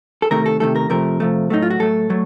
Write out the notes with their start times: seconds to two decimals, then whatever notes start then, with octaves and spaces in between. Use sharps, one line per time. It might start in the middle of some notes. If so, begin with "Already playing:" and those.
0.22 A4
0.31 C3 D#3 A3 A#4
0.46 A4
0.60 C3 D#3 A3 A4
0.76 A#4
0.90 C3 F3 A3 A#4
1.20 C3 F3 A3
1.50 A2 F#3 A3 D#4
1.62 F4
1.70 F#4
1.80 A2 F#3 A3 A4
2.10 F#3 A3